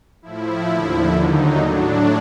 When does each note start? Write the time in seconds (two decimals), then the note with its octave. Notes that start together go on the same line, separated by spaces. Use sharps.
0.22 A2 F3 E4
0.67 D#2 D3 F3
1.13 D#2 D3 F#3 D#4
1.58 A2 F#3 D4